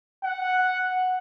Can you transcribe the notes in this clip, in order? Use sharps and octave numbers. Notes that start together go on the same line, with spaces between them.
F#5